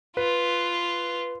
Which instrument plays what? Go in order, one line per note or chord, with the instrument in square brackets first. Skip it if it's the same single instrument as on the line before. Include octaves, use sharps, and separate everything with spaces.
[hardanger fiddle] F4 [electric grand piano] B4